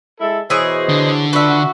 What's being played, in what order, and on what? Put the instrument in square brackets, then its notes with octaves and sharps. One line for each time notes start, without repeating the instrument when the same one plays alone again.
[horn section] G#3 E4 A4
[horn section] B2 C5 D#5 [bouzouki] E3 G#4 C#5
[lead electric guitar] D3
[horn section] D4 F4 B4 [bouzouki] F#4 E5